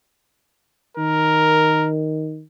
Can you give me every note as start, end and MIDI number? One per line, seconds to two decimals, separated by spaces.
0.97 2.42 51
0.97 1.88 70